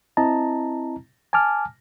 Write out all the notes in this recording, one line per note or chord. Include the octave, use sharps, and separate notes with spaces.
C4 E4 D#5 A5 A#5
G#5 A5 D6 F6